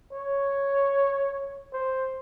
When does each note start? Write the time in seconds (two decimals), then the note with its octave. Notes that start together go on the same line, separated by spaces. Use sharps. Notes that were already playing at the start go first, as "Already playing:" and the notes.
0.12 C#5
1.73 C5